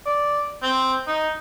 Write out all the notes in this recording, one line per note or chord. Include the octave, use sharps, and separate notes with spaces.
D5
C4
D#4